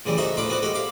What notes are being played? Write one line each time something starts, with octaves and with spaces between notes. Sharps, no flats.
A2 C#3 E3 G3
D#4 F#4 A4 C5 E5
A2 D4 F4 B5 D6
B3 C4 F#4 B4
G#3 F#4 G4 A4
F5 B5 D6